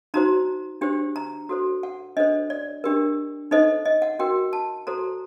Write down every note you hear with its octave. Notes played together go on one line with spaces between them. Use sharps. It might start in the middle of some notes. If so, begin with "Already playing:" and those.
D#4 F#4 C5 A#5
D4 G4 C5
A#5
F#4 A4 C5
F#5
D4 A4 C5 D#5
D5
D4 G4 A#4
D#4 A4 C5 D#5
D#5
F#5
F#4 A#4 G5
A5
F#4 A4 C5 A#5